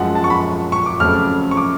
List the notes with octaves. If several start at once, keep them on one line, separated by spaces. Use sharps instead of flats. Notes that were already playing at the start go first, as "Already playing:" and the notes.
Already playing: F#2 F3 G#3 F#5
A5
C#6
B5
C#6
D6
F2 C#3 F#3 A3 F6
C#6
D6